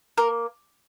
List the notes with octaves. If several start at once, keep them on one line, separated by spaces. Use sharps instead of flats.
A#3 A#4